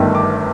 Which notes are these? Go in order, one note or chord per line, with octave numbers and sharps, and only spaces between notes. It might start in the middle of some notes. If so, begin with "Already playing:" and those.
Already playing: G1 G2 D#3 A3
D6